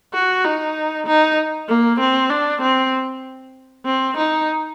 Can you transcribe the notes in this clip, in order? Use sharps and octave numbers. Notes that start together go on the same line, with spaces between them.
F#4
D#4
D#4
A#3
C4
D4
C4
C4
D#4